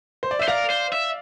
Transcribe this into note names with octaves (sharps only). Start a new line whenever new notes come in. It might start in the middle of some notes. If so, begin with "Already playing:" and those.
C5
D5
C5 E5
A#4 D5 F5
C5
E5